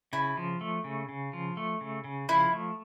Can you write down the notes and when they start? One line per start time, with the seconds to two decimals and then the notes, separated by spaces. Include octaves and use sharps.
0.13 C#3 E4
0.37 F3
0.61 A3
0.84 C#3
1.09 C#3
1.33 F3
1.57 A3
1.81 C#3
2.04 C#3
2.29 F3 E4
2.53 A3